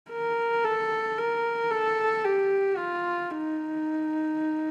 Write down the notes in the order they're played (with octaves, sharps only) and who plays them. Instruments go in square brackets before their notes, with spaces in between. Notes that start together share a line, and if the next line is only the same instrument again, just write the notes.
[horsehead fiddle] A#4
A4
A#4
A4
G4
F4
D#4